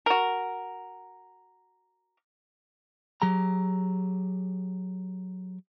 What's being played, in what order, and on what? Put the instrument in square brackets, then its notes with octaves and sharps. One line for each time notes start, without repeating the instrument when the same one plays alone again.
[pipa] F#4 A#4
[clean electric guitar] F#3 G4 G#4 A#5